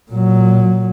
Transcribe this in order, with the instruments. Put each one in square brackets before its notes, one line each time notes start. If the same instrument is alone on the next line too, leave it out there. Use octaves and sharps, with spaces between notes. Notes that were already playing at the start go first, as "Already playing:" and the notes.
[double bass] A#2 F#3